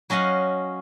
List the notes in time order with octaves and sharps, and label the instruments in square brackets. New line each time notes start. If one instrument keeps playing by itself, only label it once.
[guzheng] F#3 C#4 D#5 F5 F#5